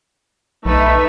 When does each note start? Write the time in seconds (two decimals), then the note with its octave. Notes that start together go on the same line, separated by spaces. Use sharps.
0.66 B1 A3 D#4 B4 E5